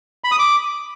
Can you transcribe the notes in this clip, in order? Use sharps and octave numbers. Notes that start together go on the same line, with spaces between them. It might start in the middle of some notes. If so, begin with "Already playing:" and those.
B5
D#6
D6